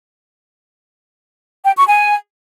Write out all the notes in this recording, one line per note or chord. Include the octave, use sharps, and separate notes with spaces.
G5
C#6
G#5